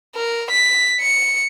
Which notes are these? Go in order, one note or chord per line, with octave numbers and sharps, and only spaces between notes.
A#4
B6
C#7